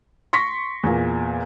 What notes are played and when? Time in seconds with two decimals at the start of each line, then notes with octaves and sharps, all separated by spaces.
0.33 C6 C#6 A#6 B6
0.84 E2 A#2